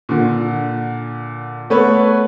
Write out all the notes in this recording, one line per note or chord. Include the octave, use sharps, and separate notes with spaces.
A#2 D3
A3 B3 B4 C#5